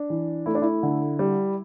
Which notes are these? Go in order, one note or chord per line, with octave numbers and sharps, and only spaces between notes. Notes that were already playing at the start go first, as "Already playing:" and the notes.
Already playing: D4
E3
A3 E4
D4
E4
D3
G3